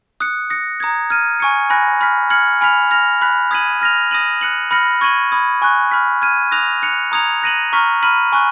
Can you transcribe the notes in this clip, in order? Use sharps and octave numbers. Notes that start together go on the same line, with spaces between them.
D#6 F#6 C#7
D#6 A#6 C#7
A#5 D#6 G#6
F6 G#6 D#7
G#5 C#6 G#6 C#7
G#5 B5 F#6 A#6
B5 F6 B6
F6 G#6 C#7 F#7
G#5 B5 F6 B6 F7
F6 A#6 F7
B5 F#6 B6
D#6 G#6 B6 D#7 F#7
F6 A#6 F7
D#6 A#6 D#7 F#7
F#6 C#7 F#7
B5 F6 A#6 C#7 F#7
C#6 G#6 D#7 F#7
B5 D#6 G#6
G#5 C#6 F#6
B5 F6 B6
F6 G#6 D#7
D#6 F#6 A#6 F7
F#6 C#7 F7
A#5 D#6 G#6 C#7 F7
F#6 A#6 D#7 F#7
A#5 C#6 F6 B6
B5 F6 B6 D#7 F#7
G#5 C#6 F#6